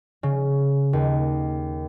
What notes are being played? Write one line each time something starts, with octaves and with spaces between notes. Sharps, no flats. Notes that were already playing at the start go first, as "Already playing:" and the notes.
C#3
D#2